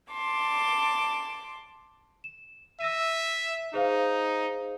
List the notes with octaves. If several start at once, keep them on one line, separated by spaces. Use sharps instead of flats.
A5 C6 D6
E7
E5 E6 A#6 D#7
D#4 G#4 C5 F5